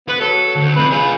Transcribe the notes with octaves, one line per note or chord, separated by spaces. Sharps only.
B3 B4
F#3 A4
D2
C3 F3 B4
F4 G#4 B4